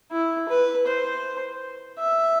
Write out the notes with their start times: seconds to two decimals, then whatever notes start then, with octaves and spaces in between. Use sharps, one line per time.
0.11 E4
0.49 B4
0.87 C5
1.99 E5